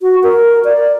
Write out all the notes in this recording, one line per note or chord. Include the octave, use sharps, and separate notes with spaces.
F#4
A#4
D5